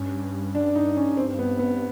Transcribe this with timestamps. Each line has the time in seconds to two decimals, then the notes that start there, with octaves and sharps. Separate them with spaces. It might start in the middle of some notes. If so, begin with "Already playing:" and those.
Already playing: G2 C#4
0.55 D4
0.76 D#4
0.97 C#4
1.17 C4
1.39 B3
1.59 B3